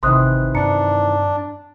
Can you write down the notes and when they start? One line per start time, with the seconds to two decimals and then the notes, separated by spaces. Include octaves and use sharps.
0.03 G#1 C3 D#3 E3 C6 D#6 F#6
0.55 G2 D4 G5 A#5 C#7